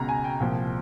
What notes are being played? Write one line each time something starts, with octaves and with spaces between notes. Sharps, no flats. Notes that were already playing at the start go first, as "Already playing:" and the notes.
Already playing: C#2 B2 A#5
G#5
G5
C2 A#2 F3